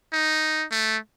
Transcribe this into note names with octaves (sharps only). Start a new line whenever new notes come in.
D#4
A3